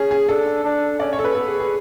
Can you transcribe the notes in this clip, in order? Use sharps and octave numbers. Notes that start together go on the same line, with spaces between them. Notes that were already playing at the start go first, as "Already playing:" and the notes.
Already playing: C#4 G#4
G#4
D4 A4
D4
C#4 D5
C#5
A4
B4
B3 A4
G#4
G#4